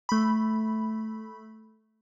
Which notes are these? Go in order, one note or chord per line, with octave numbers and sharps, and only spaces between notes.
A3 B5